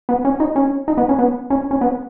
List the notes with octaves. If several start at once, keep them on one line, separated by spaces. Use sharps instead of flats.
B3
C#4
D#4
C#4
D#4
B3
C#4
B3
C#4
C#4
B3